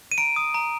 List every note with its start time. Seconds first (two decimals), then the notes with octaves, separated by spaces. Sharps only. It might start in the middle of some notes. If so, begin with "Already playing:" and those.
0.12 D#7
0.18 A#5 D7
0.36 D#6
0.54 A#5